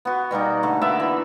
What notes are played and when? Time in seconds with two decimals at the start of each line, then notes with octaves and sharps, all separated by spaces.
0.05 B3 F#4
0.31 B2 G3 A#3 D#4
0.63 D3 A3
0.81 A#3 B3 D5 E5
1.00 E3